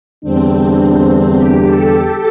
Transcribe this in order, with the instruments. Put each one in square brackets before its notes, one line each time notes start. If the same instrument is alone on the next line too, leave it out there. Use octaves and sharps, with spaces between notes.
[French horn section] E2 D3 G3 D4 [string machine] C4
[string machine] G4
A4
A4